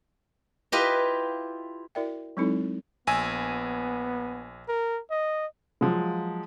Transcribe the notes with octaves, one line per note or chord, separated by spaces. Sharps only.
E4 F4 G4 B4 D#5
E4 F#4 A#4 D5 E5 G5
F#3 G#3 C4 D#4 E4 A4
A#1 B3 G#5 E6
A#4
D#5
F3 F#3 G#3